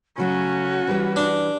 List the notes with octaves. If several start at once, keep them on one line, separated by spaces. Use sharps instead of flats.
C#3 F#3 A3 C#4 F#4
E3 G3 B4
D4